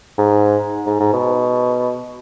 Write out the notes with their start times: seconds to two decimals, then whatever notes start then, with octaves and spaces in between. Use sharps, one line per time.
0.18 G#2
0.86 G#2
1.00 G#2
1.13 B2